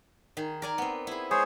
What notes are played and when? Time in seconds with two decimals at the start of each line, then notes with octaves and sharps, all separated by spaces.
0.37 D#3 G#4
0.62 A#4 D5 G#5
0.78 B3 C4
1.07 E4 G#4
1.31 G#3 G#4 C5 C#5